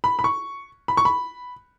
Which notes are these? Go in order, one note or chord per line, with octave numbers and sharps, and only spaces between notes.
B5
B5
C#6
B5
C#6
B5